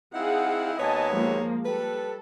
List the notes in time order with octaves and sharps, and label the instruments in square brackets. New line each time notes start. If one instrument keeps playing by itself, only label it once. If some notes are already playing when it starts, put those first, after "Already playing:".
[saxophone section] C4 D#4 E4 [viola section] G#4 F5 F#5
[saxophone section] D#2 B3 C#5 [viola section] D#5 G#5 A5
[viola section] F3 G#3 A#3
[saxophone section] G3 B4 [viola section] A4